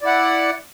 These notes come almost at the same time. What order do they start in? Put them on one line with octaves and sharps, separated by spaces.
D5 E4 F#5